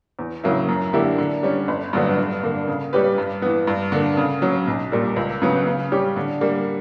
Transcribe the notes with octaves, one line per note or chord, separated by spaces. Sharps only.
E2
C#3 F#3 A#3 E4
F#2
D3 A#3 E4 G4
D3
G3 C#4
G1
G2 D3 F#3 B3
G2
D3 A#3
C#3
G3 C#4 G4 B4
G2
E3 B3
G2
D3 A#3
C#3
F#3 C#4
B1
A#2 G3 A#3
C#2
C#3 F#3 B3
C#3
G3 C#4 G4
D3
G3 A#3